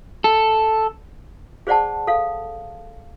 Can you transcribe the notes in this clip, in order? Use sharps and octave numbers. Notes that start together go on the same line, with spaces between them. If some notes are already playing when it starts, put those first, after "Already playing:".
A4
G#4 C5 D5 F#5 A5
A4 F5